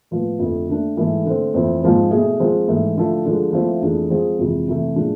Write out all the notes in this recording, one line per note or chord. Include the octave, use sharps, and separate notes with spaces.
A2 F3 B3
F2 D3 A3
D3 A3 D4
G#2 E3 A3 E4 A4
D3 A3 C4
F2 E3 A3 C4
G#2 F3 G#3 C4 G#4
B2 A3 E4 G#4
F3 G#3 C4
G#2 E3 A3
D3 F3 A3 E4 A4
D3 F3 G#3
F3 A3 C4 E4
F2 E3 A3 D4 G#4
F3 G#3 C4 G#4
F2 C3 E3 G#3
C3 E3 A3
A2 F3 G#3 D4